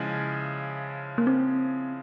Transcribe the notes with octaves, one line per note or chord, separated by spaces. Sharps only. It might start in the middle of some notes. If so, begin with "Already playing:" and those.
Already playing: C#3 F3 G#3 E4
A#3
C4